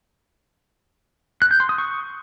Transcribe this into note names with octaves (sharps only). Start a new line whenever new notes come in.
F#6
G6
C6
D#6
C#6